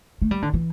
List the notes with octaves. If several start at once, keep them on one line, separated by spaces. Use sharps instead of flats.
A3
G3
D3
E3